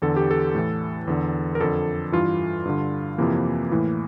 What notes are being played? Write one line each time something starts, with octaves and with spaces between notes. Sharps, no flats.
E2 D3 A4
G4
A4
A2 E3
E2 D3
A#4
F2 D3 A4
G2 E3 F4
G2 D3
F2 C3 E3 A#3
A2 E3